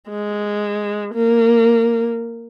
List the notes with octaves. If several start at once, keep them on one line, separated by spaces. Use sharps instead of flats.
G#3
A#3